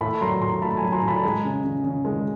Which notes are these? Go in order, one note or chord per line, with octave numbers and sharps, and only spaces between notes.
A2 A5 B5
F#3 A#5 C6
A2 A#5 C6
A3 A5 B5
G#5 A#5
F#3
A#5 C6
A2
A5 B5
G#3 G#5 A#5
C#3
C#3
C#3
G#3